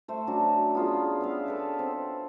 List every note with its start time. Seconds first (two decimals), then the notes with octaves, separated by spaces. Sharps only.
0.08 A3 C5
0.27 F#3 C#4 D4 F#4
0.75 B3 F4 G#4
1.21 B3 E5 F5
1.46 A4 B4 G5
1.79 C4